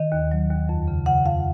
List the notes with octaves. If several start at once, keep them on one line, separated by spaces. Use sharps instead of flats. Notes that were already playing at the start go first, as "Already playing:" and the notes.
Already playing: D#3 D#5
D#2
F#3
D#2
F2
C#3
C#3 F#5
F2 F5